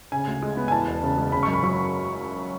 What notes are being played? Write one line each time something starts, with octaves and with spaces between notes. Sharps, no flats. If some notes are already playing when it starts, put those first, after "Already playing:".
C#3 G#5
D2
G#3
B3
G#5
E2 A5
E1
C#3
G#3
C#3 B5
F#2 C#6
B5
F#3 C#6